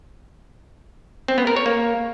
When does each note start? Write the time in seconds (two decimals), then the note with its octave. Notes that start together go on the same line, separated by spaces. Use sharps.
1.28 C4
1.38 B3
1.47 A#4
1.56 C#5
1.66 A#3